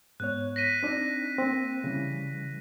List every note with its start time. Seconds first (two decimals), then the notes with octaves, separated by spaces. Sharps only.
0.20 G#2 B3 C#5 F#6
0.56 A#6 B6 D#7
0.83 C4 D4 D#4
1.38 A#3 C4
1.84 C#3 E3 G3